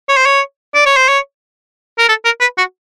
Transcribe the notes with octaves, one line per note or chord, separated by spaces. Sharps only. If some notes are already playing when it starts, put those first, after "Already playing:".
C#5
C5
C#5
D5
C#5
C5
C#5
A#4
A4
A#4
B4
F#4